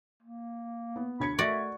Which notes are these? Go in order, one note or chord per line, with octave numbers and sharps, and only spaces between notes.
A#3
B3
D2 B5 G#6 C#7
A3 F#4 D5 E5